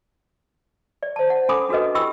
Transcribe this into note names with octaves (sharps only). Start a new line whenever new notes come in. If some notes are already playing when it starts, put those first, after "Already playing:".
D5
C5 A5
F#5
C#4 A4 G#5 B5 D6 D#6
D4 F#4 A4 B4 D#5
E4 G4 G5 B5 E6